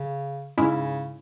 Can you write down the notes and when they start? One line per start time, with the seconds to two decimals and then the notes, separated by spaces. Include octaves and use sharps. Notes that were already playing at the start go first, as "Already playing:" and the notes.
Already playing: C#3
0.58 G#2 C#3 G#3 C#4 E4